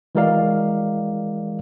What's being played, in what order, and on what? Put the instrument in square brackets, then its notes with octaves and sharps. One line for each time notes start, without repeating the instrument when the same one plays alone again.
[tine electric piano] E3 G#3 F#4 A#4 D5 F5